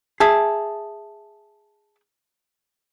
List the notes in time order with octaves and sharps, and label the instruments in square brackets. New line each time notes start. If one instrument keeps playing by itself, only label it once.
[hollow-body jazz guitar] G#4 [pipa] E5 A5